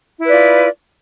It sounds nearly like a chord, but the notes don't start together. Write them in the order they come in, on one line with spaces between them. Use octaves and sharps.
E4 B4 D5 F4